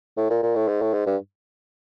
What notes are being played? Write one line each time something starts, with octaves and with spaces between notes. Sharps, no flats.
A2
A#2
A#2
A2
G#2
A2
G#2
G2